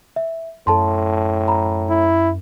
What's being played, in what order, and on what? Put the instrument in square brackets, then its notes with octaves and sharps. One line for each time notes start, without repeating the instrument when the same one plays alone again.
[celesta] E5
[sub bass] F#2 [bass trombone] A2 [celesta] A4 A5 C6
[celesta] A#5 B5
[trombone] E4